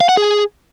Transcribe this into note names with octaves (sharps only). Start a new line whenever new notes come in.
F5
F#5
G#4